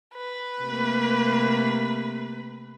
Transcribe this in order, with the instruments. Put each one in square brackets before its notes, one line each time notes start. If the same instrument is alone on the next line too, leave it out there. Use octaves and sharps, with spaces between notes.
[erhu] B4
[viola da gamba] C3 A3 A#3